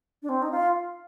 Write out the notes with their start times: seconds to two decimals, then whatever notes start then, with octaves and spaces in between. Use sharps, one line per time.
0.22 D4
0.29 C4
0.42 D#4
0.51 F4